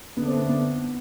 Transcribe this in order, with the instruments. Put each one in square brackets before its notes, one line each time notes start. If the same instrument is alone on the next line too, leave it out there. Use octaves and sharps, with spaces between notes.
[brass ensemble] D3 A3 D4 [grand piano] B3
[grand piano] C4
B3
B3